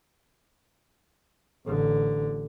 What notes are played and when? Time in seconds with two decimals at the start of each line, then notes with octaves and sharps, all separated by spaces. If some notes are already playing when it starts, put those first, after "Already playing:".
1.66 A1 D3